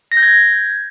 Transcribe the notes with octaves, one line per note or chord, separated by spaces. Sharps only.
A#6
G6
G#6